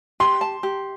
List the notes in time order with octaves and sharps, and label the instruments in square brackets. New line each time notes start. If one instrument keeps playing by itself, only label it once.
[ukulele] G4 [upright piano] C6
[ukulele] A5
G4